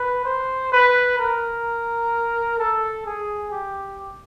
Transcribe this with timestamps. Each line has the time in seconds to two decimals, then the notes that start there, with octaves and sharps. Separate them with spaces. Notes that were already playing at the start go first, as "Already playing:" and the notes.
Already playing: B4
0.25 C5
0.72 B4
1.19 A#4
2.59 A4
3.06 G#4
3.52 G4